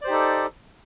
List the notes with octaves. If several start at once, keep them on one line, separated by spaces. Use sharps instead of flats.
D#4 G4 A4 C5 D5